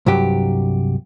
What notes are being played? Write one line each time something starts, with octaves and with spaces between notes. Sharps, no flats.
C2 G2 F#3 G4